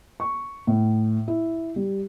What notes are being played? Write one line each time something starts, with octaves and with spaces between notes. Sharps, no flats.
C#6
A2
E4
G3